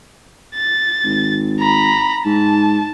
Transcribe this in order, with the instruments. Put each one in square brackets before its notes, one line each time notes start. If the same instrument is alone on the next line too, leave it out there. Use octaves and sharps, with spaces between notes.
[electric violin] A6
[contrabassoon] G#1
[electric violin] A#5 B5
[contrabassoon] G#2 [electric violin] A5